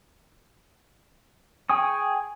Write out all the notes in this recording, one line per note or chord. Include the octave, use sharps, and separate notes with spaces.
G#4 G5 G#5 C#6 D#6